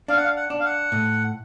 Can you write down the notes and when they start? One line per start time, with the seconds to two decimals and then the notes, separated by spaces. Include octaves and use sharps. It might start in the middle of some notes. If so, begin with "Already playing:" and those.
0.08 D4 F5
0.17 F#5
0.24 F5
0.37 F#5
0.50 D4
0.60 F5
0.65 F#5
0.92 A2